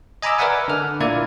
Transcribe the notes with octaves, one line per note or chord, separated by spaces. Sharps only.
D#5 G#5 A#5 B5 D6 E6
A#4 B4 D5 E5 F#5 G#5
D3 F6
A#2 A#3 E4 D5 G#6